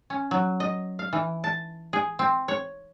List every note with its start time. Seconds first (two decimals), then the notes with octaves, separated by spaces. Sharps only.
0.10 C#4
0.31 F#3
0.60 D#5
0.99 F5
1.13 E3
1.44 A5
1.93 G#4
2.19 C4
2.48 C#5